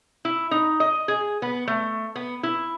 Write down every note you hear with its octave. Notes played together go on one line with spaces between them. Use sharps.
E4
D#4
D#5
G#4
B3
A3
B3
E4